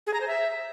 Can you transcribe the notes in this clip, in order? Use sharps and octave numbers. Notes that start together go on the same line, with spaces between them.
G#4
A#5
C5
E5